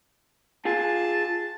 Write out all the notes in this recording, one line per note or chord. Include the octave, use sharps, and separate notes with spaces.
F4 G#4 A5